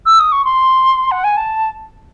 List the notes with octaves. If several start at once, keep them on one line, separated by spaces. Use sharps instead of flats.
E6
D#6
C#6
C6
F#5
G#5
A5